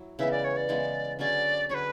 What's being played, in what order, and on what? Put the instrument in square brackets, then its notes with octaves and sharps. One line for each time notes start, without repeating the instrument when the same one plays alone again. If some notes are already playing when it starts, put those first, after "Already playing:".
Already playing: [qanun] F#3 E4
[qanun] C#3 E3 G#3 B3 [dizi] E5
[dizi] D5
C#5
D5
[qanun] C#3 E3 G#3 B3
[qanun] D3 F#3 C#4 G#4 [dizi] D5
[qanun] D3 F#3 C#4 G#4 [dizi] B4 C#5